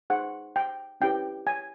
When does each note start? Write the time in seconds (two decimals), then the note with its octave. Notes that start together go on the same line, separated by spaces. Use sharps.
0.10 D#4 G#4 C5 F#5
0.56 G5
1.01 C#4 E4 G4 B4 G5
1.47 G#5